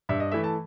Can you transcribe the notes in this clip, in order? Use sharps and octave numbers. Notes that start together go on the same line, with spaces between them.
G2 E5
D#5
E3 A3 E5
A5